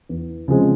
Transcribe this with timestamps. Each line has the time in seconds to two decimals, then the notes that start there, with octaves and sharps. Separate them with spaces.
0.09 E2
0.48 C#3 F3 G#3 C4